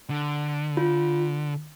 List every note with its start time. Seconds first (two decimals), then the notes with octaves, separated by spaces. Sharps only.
0.10 D3
0.77 F4